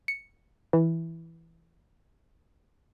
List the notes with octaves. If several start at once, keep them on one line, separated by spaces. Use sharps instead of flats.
C#7
E3